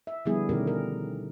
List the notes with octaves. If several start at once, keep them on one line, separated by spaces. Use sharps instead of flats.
E5
D3 F3 G3 B3 E4 G#4
B2 D3 D#3 C#4 G4 A#4
A#4